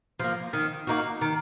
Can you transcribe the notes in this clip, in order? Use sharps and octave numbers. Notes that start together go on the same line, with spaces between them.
F3 A#3
D#3
A#3 D#4 F#4
D#3